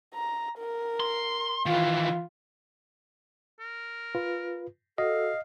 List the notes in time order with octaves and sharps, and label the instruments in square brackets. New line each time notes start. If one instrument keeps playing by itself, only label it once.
[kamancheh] A#5
A#4
[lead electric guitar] C6
[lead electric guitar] D#3 E3 [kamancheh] F4
[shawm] A#4
[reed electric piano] F4 B4
[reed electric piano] F#4 [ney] A4 [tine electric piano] D#5 [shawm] F5